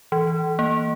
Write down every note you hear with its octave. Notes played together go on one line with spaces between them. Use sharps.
E3
A#3